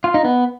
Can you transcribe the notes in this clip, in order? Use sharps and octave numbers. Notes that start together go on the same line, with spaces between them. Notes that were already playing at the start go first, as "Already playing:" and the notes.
F4
D#4
B3